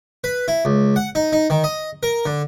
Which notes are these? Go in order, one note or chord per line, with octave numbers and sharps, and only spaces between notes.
B4
E4
C#2
F#5
D#4
D#4
D#3
D#5
A#4
D3